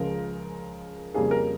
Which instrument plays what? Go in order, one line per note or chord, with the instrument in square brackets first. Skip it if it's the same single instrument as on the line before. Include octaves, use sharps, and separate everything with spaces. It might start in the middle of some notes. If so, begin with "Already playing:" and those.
Already playing: [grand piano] C#2 C#3 F3 G#3 A#4
F2 C#3 G3 A#3 G#4
A#4